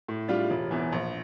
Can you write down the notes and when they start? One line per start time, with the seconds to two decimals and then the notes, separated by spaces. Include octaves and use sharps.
0.08 A2
0.28 G3 D4 F4
0.50 E1
0.71 E2 E3
0.92 A#1